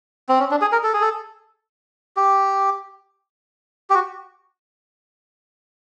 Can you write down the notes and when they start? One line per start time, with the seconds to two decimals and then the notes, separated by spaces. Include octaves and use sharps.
0.29 C4
0.40 C#4
0.51 D4
0.61 G#4
0.72 A#4
0.84 A4
0.93 G#4
1.02 A4
2.17 G4
3.90 G4
3.94 F#4